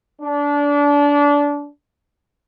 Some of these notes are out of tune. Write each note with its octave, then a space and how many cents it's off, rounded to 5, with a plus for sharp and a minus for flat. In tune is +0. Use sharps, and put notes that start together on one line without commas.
D4 -25